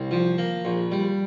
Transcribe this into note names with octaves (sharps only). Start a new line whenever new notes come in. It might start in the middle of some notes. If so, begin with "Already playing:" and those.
Already playing: C2
F3
A#3
A#1
G3